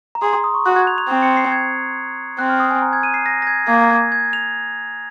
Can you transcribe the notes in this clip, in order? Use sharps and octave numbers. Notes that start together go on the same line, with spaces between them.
A#5
G#4 C6
C6
D#6
C#6
F#4 F#6
G#6
F7
F7
C4
C#7
C7
G#6
C4 F#6
F6
D#6
G#5
A#5
G#6
D#7
C7
A#6
A#6
G#6
A#3 G#6
G#6
G#6
F7